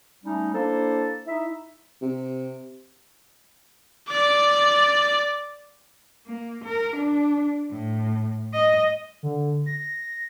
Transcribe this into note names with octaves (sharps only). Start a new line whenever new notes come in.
G3 A3 C#4 D#4
A#3 D4 E4 A4 C5
D#4 E4 E5
C3
D5 D6
A#3
A#4
D4
A2
D#5
D3
A#6